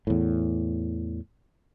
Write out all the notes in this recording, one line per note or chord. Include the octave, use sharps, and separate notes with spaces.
E2 A2